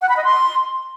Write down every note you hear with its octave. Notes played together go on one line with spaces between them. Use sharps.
F#5
B5
D#5
C6